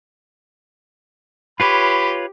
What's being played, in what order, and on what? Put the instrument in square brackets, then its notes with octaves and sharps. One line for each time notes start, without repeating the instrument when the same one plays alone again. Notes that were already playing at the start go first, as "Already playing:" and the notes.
[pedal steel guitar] F4 B4 C#5 [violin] G4 [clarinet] B5